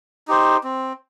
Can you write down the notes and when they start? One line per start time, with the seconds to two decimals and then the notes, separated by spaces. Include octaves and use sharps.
0.28 D#4 G4 C5
0.64 C4